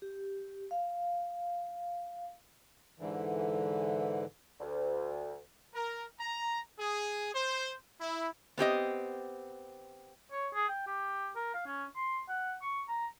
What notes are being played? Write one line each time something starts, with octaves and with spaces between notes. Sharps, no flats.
G4
F5
G#2 D3 E3
D2
A#4
A#5
G#4
C5
E4
B3 C4 G4 D#5
C#5
G#4
G5
G4
A#4
F5
C#4
C6
F#5
C#6
A#5